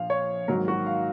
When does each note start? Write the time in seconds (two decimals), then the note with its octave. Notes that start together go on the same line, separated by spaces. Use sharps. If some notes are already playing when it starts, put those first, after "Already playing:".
Already playing: A#1 F3 F5
0.10 C#5
0.48 G#2 D#3 F#3 A#3 A#4
0.68 F#4
0.86 F5